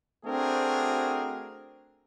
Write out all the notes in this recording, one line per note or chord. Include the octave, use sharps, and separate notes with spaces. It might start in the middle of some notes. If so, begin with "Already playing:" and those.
A3 C4 D4 F#4 G#4 A#4